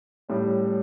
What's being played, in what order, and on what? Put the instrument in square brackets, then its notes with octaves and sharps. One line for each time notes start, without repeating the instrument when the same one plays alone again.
[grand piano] A2 G3 C#4